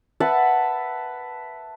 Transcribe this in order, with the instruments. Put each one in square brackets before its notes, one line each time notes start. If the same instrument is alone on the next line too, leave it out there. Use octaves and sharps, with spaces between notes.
[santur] B4 E5 F#5 A5